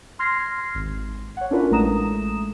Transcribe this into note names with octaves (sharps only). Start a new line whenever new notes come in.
C6 F6 G#6 A#6 C7
G#1
C#5 F#5
C#4 D4 E4 F4 A#4 B4
A1 G#3 A3 A#5 D#6 E7